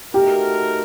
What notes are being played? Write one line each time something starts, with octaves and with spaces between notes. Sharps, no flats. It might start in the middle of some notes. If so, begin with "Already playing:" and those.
A3 D#4 F#4 G4 A#4